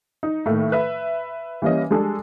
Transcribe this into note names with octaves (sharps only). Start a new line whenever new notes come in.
D#4
A2 D#3 A3 A#3
B4 E5
E3 G3 A#3 C#4 D#5
G3 G#3 D4 G#4 A4